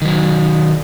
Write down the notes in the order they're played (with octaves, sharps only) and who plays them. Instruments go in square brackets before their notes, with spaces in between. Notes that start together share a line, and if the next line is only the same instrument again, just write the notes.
[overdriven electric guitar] D#3 F#3